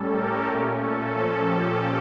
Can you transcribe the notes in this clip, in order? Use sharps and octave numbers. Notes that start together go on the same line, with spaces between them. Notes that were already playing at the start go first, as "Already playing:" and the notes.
Already playing: A2 G3 C#4 A4
G4 A#4
A#2 A3 C#4
A4
A#2 F3 C#4 A4
G4